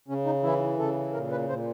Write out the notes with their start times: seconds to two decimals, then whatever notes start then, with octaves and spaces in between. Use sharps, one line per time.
0.08 C#3 C#4
0.25 D#4
0.43 E3 E4
0.79 C#3 A4
1.14 A#2 A#4
1.31 B4
1.49 A#2 C5